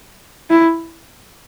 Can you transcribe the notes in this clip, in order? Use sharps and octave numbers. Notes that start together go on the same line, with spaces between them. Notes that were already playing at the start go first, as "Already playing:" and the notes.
E4